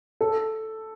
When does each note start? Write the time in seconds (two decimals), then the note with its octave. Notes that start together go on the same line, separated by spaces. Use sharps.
0.21 A4